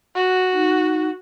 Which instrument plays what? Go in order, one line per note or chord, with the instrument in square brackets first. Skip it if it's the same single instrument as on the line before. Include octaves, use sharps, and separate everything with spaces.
[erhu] F#4
[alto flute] D#4